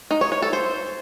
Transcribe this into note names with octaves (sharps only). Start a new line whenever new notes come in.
D#4
C#5
C#5
A4
C5